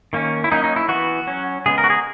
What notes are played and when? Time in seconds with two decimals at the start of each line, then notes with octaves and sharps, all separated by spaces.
0.13 D#3 A#3 C#4
0.44 E4
0.52 F#3 A#3 C#4 D#4
0.64 D#4
0.76 E4
0.89 E3 B3 F#4
1.27 F#3 C#4
1.66 C#3 G#3 B3 G#4
1.78 A#4
1.84 F#4
1.90 G#4